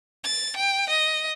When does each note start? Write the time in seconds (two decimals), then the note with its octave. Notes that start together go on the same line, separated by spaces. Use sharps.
0.24 A6
0.57 G5
0.89 D#5